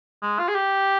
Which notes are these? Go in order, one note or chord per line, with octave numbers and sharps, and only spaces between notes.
G#3
F4
G#4
G4